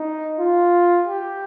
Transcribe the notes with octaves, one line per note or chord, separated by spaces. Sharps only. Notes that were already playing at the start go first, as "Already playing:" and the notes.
Already playing: D#4
F4
G4